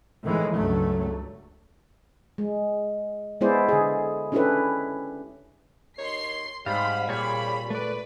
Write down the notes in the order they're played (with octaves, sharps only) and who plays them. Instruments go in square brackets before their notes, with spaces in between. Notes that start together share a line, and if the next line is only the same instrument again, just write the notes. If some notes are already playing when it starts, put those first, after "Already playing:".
[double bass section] A2 D#3 E3 G#3
C#2 G2 F#3 A3
[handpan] G#3
G#3 B3 E4 G#4 C5 D5
D3 G#4
C#4 D4 E4 G4 A4 B4
[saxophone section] D#2 D#4 C#5 [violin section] C6 C7
[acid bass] G#2 [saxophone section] C3 G3 [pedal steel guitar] C5 F5 [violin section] B5
[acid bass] A#2 [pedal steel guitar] G#4 C#5 F5 [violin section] B5
[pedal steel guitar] A3 D5 [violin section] B4